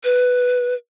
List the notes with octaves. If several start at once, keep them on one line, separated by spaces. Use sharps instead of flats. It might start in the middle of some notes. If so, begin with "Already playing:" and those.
B4